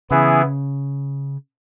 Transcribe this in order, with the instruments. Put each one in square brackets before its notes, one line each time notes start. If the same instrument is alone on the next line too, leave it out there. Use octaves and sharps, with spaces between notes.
[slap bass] C#3 [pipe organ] E3 B3 E4 G#4